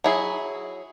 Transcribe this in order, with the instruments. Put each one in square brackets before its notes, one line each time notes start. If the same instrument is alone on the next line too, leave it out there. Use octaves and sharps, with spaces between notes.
[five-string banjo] F#3 E4 G#4